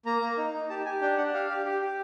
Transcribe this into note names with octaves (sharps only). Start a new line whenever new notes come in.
A#3 A#5
A#3
D#4
D#4
G4 A5
G4 G#5
D4 G5
D4 F#5
G4 F5
G4
G4
G4